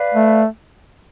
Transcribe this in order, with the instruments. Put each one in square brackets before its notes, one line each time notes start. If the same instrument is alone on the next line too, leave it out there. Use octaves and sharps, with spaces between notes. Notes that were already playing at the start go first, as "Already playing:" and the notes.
Already playing: [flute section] B4 D5 F5
[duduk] A3